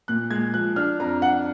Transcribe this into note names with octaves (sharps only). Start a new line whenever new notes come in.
A#2 F#6
G#3 G#6
F3 F#6
D4 F6
F2 A#5
D4 F#5